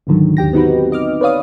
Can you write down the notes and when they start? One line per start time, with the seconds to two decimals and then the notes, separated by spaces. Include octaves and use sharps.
0.07 C#2 G#2 D3 D#3 F#3
0.37 D#2 G4 G5 A#6
0.53 B3 C4 D#4 F#4 G4 B4
0.92 D#5 D6 F6
1.21 B4 C#5 D5 F5 D#6